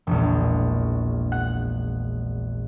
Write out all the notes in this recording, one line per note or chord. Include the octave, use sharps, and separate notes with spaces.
E1 A#1
F#5